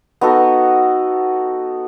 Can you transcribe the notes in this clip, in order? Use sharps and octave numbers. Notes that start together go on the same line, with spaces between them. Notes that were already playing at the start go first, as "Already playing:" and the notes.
B3 D#4 F#4 A4